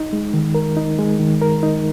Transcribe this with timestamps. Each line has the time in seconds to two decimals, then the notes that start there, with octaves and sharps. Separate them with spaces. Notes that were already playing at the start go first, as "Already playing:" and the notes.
Already playing: D#4
0.13 G#3
0.34 D#3
0.55 A#4
0.77 D#4
0.99 G#3
1.19 D#3
1.42 A#4
1.63 D#4